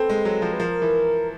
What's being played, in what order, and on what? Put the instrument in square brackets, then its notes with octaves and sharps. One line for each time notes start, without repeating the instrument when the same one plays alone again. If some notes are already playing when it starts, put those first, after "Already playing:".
Already playing: [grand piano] B3 C4 [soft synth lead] A4
[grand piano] G#3
F#3
F3
[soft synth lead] B4
[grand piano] F3 [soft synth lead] A#4
[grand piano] E3